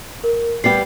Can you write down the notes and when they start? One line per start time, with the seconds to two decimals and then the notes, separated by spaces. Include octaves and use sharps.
0.24 A#4
0.64 G3 B3 G4 C7